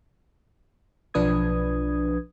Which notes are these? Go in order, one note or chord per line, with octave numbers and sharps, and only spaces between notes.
B1 F3 D4 B4 D#6 G#6